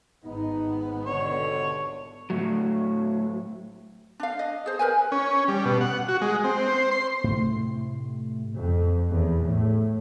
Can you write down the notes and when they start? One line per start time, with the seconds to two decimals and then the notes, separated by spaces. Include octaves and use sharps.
0.25 G#1 B3 D#4
1.06 C2 B2 D3 C#5
2.30 A2 F#3
4.20 D4 F5
4.39 D#5
4.66 G#4 C5
4.79 A#4 B4 G#5
5.12 C#4
5.48 G3
5.65 B2
5.81 F#5
6.08 F#4
6.22 G#3
6.44 C4
6.68 C5
6.91 C6
7.24 A2 C3 A3
8.59 F2
9.11 E2
9.45 A2